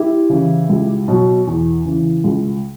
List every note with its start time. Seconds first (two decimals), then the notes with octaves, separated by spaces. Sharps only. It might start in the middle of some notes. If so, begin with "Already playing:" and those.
Already playing: E4 G4
0.30 C#3 E3
0.69 C#2
1.08 B2 F#3
1.47 E2
1.85 C#3 E3
2.24 C#2